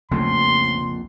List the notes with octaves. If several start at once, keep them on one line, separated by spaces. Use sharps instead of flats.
A#1 F2 A#2 C#3 A3 C6